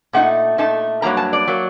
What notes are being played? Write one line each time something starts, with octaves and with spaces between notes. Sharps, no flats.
A#2 A3 D#4 F#5
A#2 A3 D#4 A5
G2 F#3 A#3 A#5
A5
D5
F#3 A#3